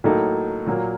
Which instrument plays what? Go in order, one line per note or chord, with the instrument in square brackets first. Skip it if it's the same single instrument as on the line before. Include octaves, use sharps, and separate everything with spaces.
[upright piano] A2 F#3 A#3 D#4 A4
A#2 F#3 A#3